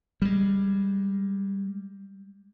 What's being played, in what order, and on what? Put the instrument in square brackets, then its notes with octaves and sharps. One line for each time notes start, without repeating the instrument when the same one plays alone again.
[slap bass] G3 G#3